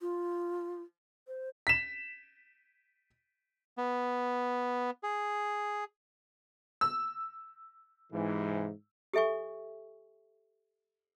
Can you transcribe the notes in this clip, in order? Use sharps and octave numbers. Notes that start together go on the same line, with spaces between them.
F4
C5
B6 E7
B3
G#4
E6
G#2 C3 E3
G4 A4 E5 G#5 C#6